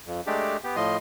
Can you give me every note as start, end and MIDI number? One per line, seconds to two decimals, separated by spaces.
0.07 0.21 41
0.27 0.57 56
0.27 0.57 57
0.27 0.57 62
0.27 0.57 67
0.64 0.76 59
0.64 0.76 67
0.76 0.97 45
0.76 0.97 53
0.76 0.97 75
0.76 0.97 84